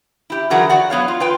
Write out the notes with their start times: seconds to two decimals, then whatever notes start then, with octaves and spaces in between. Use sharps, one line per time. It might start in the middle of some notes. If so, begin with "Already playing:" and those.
0.30 E4 G4
0.50 D3 E3 F#3 F#4 G#4 A#4
0.69 F#4 D5 F#5
0.90 F#3 B3 C#5 F5
1.08 F4
1.20 F4 B4 G5